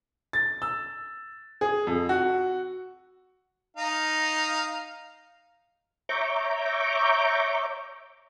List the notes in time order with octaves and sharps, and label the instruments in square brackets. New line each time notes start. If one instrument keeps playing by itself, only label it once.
[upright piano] A6
E6
G#4
F2
F#4
[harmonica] D#4 F5
[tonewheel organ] C#5 E5 A#5 C#6 D6 G6